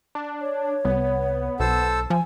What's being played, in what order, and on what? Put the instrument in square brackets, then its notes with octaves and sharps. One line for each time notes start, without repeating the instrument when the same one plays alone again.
[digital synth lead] D4
[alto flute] C#5
[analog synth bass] C2 [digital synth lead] B3
[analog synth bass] B1 [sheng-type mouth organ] A4 C5 E6
[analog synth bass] F3 [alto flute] G#5